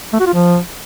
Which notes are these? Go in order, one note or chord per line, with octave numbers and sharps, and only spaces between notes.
A3
F#4
F4
F3